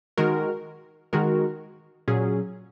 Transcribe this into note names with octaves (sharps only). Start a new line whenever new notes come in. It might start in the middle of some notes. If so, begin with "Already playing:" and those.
D#3 G#3 F#4 A#4
D#3 G#3 F#4 A#4
A#2 F#3 C#4 G#4